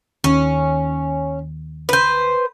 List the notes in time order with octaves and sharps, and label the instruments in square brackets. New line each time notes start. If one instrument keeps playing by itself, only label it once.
[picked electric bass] D#2 [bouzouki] C#4
[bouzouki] B4 C5